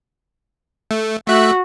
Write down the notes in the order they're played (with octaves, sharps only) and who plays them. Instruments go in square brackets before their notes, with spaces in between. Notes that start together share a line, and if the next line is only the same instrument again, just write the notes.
[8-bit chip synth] A3
[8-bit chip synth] A3 E5 F#6 [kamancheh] F#4